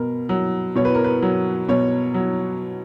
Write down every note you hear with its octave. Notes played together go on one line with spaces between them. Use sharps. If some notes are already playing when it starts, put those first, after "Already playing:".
Already playing: B2 A#4
F#3
B2 C#5
B4
A#4
B4
F#3
B2 C#5
F#3